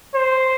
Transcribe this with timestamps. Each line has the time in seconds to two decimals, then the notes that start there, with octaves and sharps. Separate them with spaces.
0.14 C5